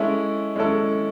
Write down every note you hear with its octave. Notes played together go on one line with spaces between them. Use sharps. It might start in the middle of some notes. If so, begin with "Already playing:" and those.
Already playing: G#3 C#4 E4 A4
G#3 C#4 E4 A4